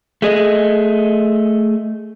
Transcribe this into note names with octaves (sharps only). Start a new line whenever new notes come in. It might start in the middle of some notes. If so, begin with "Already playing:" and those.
A3 G#4 D#5